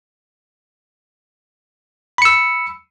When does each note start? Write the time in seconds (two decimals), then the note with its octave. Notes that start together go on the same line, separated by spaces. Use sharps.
2.18 B5
2.22 C#7
2.25 E6